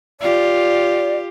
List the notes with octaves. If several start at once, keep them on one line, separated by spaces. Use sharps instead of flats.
F4 G4 D5